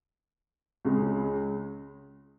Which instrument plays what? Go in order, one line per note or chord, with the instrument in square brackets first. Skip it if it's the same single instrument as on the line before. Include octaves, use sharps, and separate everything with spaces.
[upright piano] C#2 C#3 G#3